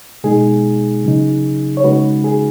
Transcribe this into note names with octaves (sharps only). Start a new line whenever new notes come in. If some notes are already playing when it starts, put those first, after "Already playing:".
B2 G#3 D#4 G#4
C#3 F#3 D#4
C#5
C#3 G#3 D#4 F#4 B4
G#4